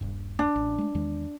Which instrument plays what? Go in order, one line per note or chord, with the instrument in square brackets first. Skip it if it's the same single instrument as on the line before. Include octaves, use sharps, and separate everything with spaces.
[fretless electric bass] D#1 G2
[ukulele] D4
[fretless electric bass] A1
G#3 A3
E2 D#3 G#3